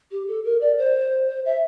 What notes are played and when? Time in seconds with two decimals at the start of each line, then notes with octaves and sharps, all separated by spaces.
0.11 G4
0.28 A4
0.44 A#4
0.61 D5
0.78 C5
1.28 C5
1.45 E5